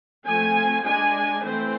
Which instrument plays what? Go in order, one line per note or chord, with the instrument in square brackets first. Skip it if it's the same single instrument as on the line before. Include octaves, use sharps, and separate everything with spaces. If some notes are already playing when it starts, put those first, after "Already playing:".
[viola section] F3 A3 C4 G#5
G#3 D4 G#5
E3 A3 C4 C5